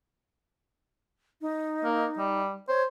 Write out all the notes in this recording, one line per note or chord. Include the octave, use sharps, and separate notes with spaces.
D#4
A#3
G3
C5 C#5